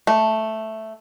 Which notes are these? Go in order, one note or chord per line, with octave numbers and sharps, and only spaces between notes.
A3